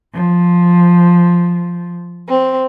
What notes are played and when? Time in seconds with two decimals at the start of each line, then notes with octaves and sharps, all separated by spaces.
0.13 F3
2.28 C4